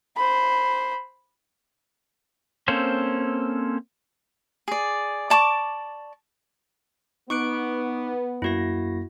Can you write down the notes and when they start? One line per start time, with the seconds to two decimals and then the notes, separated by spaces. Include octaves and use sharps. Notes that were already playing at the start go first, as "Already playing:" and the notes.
0.16 C5 B5
2.68 A#3 C4 C#4 A4 C5
4.68 G#4 D5
5.30 D5 A5 C#6 D6
7.30 B3 D#4 C#6 D6 F#6 D7
8.42 F#2 A#3 E4 F#4 A#6